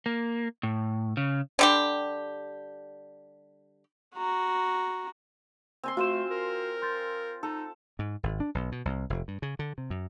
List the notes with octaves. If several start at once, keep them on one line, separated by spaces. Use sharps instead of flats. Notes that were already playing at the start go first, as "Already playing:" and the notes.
A#3
A2
C#3
D3 G3 G4
F#4 A#5
C4 G#5 C6
A3 F4 F#4 C5 C6 E7
A#4
C6 G6 A6
D#4 A4
G#2
G#1
D4
B1
B2
C2
F1
G2
C#3
D3
C3
F#2